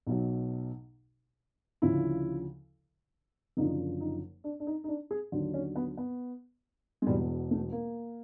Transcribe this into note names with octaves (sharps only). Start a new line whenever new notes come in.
B1 B2 F#3
D2 C#3 F3 E4
F#1 F#2 D3 F3 D#4
D#4
D4
D4
D#4
D#4
D4
G#4
D#2 D3 F#3
C#4
B3
B3
G#3
E1 E2 B2 G3
A3
A#3